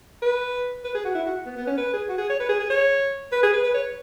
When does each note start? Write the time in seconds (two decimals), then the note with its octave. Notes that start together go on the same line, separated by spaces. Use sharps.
0.22 B4
0.84 B4
0.95 G#4
1.05 F#4
1.15 E4
1.26 F#4
1.46 B3
1.57 B3
1.67 C#4
1.77 B4
1.93 G#4
2.09 F#4
2.18 G#4
2.30 C#5
2.40 B4
2.49 G#4
2.60 G#4
2.70 C#5
3.32 B4
3.43 G#4
3.53 B4
3.64 B4
3.74 C#5